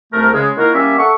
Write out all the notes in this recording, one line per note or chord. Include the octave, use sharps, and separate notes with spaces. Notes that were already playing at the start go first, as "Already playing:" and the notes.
C2 A3 A#4
C#3 G#3
A#3 D#4 E4 F#4 A#4 F5
G3 A#3 C#4 D5 E5
A4 E5 F#5 C#6